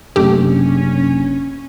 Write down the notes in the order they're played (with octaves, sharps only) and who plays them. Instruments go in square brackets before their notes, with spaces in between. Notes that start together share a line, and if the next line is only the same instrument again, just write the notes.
[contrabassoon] F#1 [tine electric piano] F#2 C3 D4 [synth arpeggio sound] A3 G4 [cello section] C#4